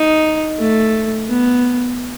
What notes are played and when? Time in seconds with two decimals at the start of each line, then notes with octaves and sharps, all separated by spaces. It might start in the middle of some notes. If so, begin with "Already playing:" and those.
Already playing: D#4
0.59 A3
1.28 B3